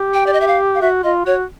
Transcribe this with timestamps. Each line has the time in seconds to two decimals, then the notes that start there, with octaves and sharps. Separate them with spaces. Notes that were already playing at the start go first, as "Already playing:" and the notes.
Already playing: G4
0.14 G5
0.27 D5
0.33 D#5
0.41 E5
0.47 F5
0.75 F5
0.81 F#4 E5
1.04 F4 D#5
1.26 F#4 C#5